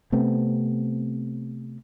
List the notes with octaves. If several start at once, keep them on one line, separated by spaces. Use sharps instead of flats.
C3 A3 B3 C4